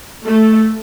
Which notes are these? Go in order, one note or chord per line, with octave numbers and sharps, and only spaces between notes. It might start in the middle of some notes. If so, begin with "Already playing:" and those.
A3